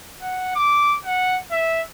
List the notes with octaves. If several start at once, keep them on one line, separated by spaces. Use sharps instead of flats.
F#5
D6
F#5
E5